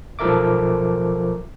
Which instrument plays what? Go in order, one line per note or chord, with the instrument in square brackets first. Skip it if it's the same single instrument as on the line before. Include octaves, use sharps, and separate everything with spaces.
[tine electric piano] B1 F3 A4 A#4 E5 D6